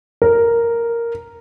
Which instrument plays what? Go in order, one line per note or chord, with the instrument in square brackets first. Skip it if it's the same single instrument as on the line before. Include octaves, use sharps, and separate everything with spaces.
[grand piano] A#4